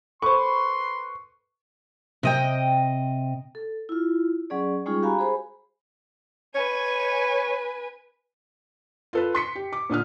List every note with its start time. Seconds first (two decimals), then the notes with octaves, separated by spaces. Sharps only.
0.22 A4 B4 C5 C6 C#6
2.23 C3 D#5 G5
3.55 A4
3.89 E4 F4
4.50 F#3 C#4 G#4 D5
4.86 G3 G#3 C#4 D#4 F4 G#4
5.02 F#4 G4 F5 G#5 A#5 B5
5.19 G#4 C5 B5
6.55 B4 C#5 G#5
9.13 F4 A4 B4
9.35 C6 B6 C#7
9.55 G4
9.73 D6
9.90 A#2 D3 D#6 F6